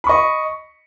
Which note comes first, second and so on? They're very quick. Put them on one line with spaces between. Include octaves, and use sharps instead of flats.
B5 C#6 D#5